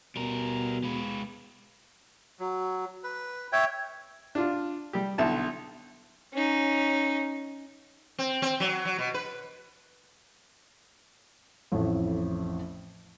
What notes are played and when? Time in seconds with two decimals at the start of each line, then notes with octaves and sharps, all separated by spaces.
0.16 B2 G3 A#4
0.84 G#3 B4
2.39 F#3
3.04 B4
3.52 C#5 E5 G5
4.35 D4 F4
4.93 G3 G4
5.18 B1 D3 E4 A5
6.33 C#4 D#4
8.19 C4
8.42 C4
8.60 F#3
8.85 F#3
8.99 B2
9.14 B4
11.72 A1 F2 A2